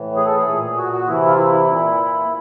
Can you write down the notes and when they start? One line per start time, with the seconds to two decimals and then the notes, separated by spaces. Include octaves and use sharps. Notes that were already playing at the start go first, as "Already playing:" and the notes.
Already playing: A2 E3
0.16 G#4
0.26 A4
0.36 G#4
0.46 A#2
0.77 F#4
0.92 F#4
1.07 C3 E3 E4
1.26 F4
1.38 E4
1.67 A#2